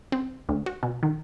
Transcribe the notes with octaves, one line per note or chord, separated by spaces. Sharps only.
C4
D2
F#4
B2
D#3